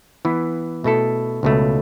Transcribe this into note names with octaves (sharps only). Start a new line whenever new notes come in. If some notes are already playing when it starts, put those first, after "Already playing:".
E3 B3 E4
B2 A3 E4 A4
C#2 B2 A3